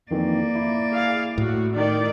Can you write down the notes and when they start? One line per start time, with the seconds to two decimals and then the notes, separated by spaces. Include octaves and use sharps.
0.11 F2 D#3 E3 A#3 D5
0.55 E4
0.92 G#4 F5
1.38 A2 F#4
1.74 D#3 D5